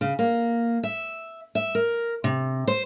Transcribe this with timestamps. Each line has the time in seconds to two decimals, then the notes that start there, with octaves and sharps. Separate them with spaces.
0.01 C#3
0.19 A#3
0.83 E5
1.55 E5
1.75 A#4
2.24 C3
2.68 C5